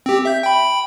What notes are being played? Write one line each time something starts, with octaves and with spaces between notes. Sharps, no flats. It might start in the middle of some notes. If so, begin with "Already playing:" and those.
C4 G4
E5 G6
G5 B5